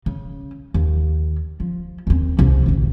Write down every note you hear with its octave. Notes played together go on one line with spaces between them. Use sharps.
C#3
D#2
F3
D#2 C4
C2
A1 D2